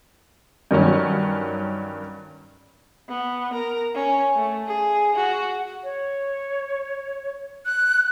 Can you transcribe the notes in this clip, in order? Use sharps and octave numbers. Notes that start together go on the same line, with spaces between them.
G2 D#3 F#3 C#4
B3
A#4
C#4
A3
G#4
F#4
C#5
F#6